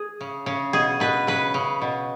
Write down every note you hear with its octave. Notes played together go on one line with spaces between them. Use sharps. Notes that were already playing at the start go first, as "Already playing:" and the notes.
Already playing: G#4
C#3
C#3
B2 G#4
B2 B4
C#3 B4
C#3
B2